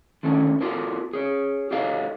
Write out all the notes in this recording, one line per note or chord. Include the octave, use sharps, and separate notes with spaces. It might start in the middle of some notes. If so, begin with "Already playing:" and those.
D3 D#3 A3 C#4 A4
F4 F#4 A4 A#4
G#4 C#5
G4 A4 C#5 D#5 F5